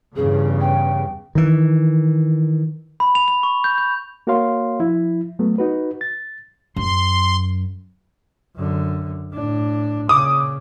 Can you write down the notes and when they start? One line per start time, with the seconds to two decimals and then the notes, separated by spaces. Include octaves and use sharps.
0.16 E2 G2 C#3 G#4
0.61 G5
1.35 D#3 E3
3.00 B5
3.15 F7
3.28 F7
3.43 C#6
3.64 G6
3.78 G6
4.27 A#3 F#4 A#4 C#5 F5 C6
4.80 F3 E4
5.39 F#3 A3 B3
5.58 D#4 F#4 B4
6.01 A6
6.76 F#2 C6
8.56 F#2 D3
9.33 A2 D4
10.09 A#2 C#3 D6 D#6